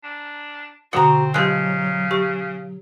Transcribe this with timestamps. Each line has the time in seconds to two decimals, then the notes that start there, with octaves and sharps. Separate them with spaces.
0.04 D4
0.93 B2 D3 C4 F#4 F#5 A#5 D#6
1.34 C#3 F3 F#3 G#3 G4 F#6
2.11 G4 C#6